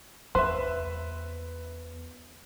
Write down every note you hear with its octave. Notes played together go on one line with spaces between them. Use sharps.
E2 B4 C5 E5